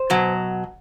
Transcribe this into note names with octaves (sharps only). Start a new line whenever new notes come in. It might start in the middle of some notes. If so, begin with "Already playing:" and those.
Already playing: C5
B2 F#3